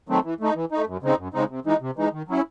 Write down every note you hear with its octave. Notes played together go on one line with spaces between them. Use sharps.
D#3 F#3 A3 C4
E3
A3 D#4
E3
A3 D#4
F#2
C#3 G#3 C4 D#4
F#2
C#3 G#3 C4 D#4
C3
E3 G#3 D#4
C3
E3 G#3 D#4
D#3
F#3 C#4 E4